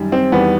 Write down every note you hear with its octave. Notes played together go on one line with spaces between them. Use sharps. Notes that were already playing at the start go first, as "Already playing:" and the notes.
Already playing: F#2 D#3 G3
C4
E2 D#3 G3 B3